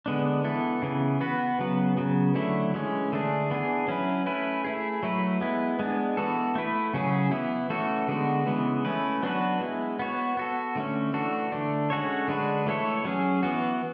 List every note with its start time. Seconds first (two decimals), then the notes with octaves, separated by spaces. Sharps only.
0.06 D3 G#3 B3 D4
0.44 E3 B3 E4 A4
0.82 C#3 E3 B3
1.21 B3 F#4 B4
1.59 C#3 F#3 B3
1.97 C#3 F#3 B3
2.35 D3 F#3 A3 E4
2.74 E3 G#3 C#4
3.12 D3 A3 D4 G#4
3.50 E3 B3 D4 G#4
3.88 F#3 C#4 E4 B4
4.26 A3 C#4 E4 B4
4.64 A3 E4 G#4
5.03 F#3 A3 E4 B4
5.41 G#3 B3 E4
5.79 G#3 B3 D4
6.17 E3 B3 F#4 A4
6.55 A3 E4 B4
6.94 C#3 F#3 C#4 G#4
7.31 E3 B3 E4
7.70 E3 A3 C#4 F#4 A4
8.08 D3 G#3 B3 F#4
8.46 C#3 E3 G#3 B3
8.85 A3 C#4 E4 B4
9.23 F#3 B3 D4 F#4 B4
9.61 G#3 B3 E4
9.99 B3 F#4 C#5
10.37 B3 F#4 A4
10.75 D3 A3 C#4
11.13 E3 A3 D4 F#4 A4
11.52 D3 A3 D4
11.90 G#3 C#4 F#4 A4 C#5
12.28 D3 G#3 D4 F#4 B4
12.66 E3 A3 E4 A4 C#5
13.05 F#3 C#4 G#4
13.43 E3 B3 F#4